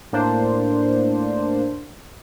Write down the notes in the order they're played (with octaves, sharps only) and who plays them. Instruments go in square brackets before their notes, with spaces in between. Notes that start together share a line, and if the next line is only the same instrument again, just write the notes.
[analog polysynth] A2 A#3 D4 C5